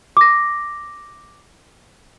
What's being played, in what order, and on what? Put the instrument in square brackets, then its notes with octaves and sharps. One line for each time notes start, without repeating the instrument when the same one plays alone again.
[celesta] D6 A#6